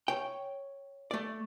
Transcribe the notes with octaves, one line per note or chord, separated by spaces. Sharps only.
C#5 G5
A3 D5